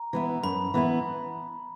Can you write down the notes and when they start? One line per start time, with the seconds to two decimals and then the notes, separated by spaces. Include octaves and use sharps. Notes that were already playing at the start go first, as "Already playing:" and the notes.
Already playing: A#5
0.13 E3 B3 E4
0.43 F#2 B5
0.74 E3 B3 E4